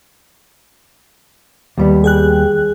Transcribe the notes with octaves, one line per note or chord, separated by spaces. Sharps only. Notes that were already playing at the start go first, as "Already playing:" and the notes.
D#2 G3 B3
G#4 G5 F#6